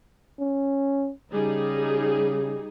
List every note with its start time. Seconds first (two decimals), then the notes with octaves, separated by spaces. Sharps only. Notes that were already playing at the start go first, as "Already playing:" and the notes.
0.40 C#4
1.31 C#3 G3 D#4 G#4